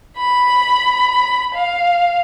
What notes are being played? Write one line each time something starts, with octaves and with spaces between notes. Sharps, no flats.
B5
F5